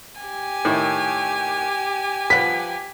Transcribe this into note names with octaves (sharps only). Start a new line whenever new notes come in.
G4 G#5
A2 D#3 E4
F3 B4 F#5 B6